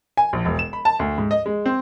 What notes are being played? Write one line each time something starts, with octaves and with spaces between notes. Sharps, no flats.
G#5
A#1
E1
E7
B5
A5
D2
G#2
D#5
G#3
C4